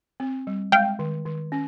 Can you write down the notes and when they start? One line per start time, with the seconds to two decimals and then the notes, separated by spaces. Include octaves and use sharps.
0.20 C4
0.47 G3
0.72 G#3 F5 G5
0.99 D#3
1.26 D#3
1.52 C#4